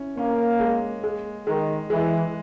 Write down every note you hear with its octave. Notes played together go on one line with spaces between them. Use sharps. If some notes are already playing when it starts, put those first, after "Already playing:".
Already playing: C#4 E4
A#3 C#4
G#3
G#3
D#3 G#3
E3 G#3